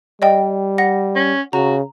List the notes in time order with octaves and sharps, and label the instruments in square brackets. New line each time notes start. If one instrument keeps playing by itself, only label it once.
[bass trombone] G3 [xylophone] D5 D#5 G5
[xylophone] F#5 A#6
[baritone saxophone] C#4
[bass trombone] C#3 [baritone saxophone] F#4 [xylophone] A#5